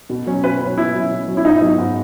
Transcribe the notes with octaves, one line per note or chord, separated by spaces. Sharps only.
B2
F#3 C#4
B2 B4
F#3 C#4
B2 E4
F#3 C#4
B2
F#3 C#4
E4
G#2 D#4
F#3 B3 E4
G#2